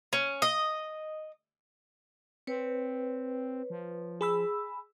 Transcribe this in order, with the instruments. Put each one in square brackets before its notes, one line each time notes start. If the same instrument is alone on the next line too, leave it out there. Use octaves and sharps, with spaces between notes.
[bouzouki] C#4
D#5
[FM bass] C4 [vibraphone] B4 C#5
[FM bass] F3
[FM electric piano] G#4 B5 E6